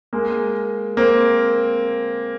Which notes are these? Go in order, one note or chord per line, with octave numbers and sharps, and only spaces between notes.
G#3 A#3
A#3 C4